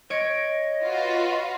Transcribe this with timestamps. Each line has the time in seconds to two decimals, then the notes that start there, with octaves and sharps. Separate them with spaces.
0.10 C#5 D#5 D7
0.82 F4 F#4 B4